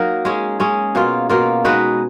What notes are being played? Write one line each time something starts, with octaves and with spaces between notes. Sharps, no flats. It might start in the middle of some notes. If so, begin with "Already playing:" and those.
Already playing: F#3 A#3 D#4 A#4
G#3 C#4 G#4
G#3 C#4 G#4
B2 A#3 F4
B2 A#3 F4
G#3 D#4 F#4 B4